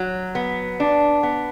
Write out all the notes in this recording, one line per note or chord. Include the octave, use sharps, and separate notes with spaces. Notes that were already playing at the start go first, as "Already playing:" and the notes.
Already playing: F#3
B3
D4
B3